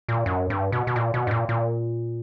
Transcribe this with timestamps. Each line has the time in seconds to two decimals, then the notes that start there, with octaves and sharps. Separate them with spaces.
0.09 A#2
0.26 F#2
0.50 G2
0.72 B2
0.87 B2
0.96 A#2
1.14 B2
1.27 G2
1.31 A#2
1.49 A#2